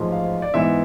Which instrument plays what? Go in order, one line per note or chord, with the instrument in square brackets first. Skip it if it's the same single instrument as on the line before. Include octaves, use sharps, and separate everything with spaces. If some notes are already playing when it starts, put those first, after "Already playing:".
Already playing: [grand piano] A1 G#2 F3 G#3
F5
D5
G#2 E3 B3 E5